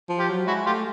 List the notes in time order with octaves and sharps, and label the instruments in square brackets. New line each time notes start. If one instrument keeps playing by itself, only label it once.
[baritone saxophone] F3
[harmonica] F4 G4
[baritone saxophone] F#3
[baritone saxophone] G#3 [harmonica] E4 F#4
[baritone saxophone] A3 [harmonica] F4 G4